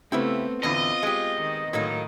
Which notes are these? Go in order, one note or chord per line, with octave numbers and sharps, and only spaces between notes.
C#3 A3 B3 C4 E4 G4
E2 A2 D3 F4 D#5
G#3 G4
D#3
A2 D#3 F#3 A#3 D#4